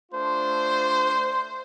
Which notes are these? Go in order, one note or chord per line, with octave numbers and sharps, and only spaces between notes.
A3 D4 F4 C5